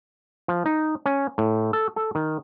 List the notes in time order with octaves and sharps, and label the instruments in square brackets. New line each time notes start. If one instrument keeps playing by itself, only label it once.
[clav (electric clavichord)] F3
D#4
C#4
A2
A4
A4
D#3